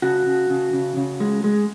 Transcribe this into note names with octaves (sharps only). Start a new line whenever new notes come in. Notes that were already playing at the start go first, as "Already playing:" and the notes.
C#3 F#4
C#3
C#3
C#3
C#3
G#3
G#3